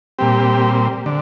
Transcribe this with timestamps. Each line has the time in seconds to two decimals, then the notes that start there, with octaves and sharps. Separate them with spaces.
0.19 A#2 G3 C4 G4
1.06 D3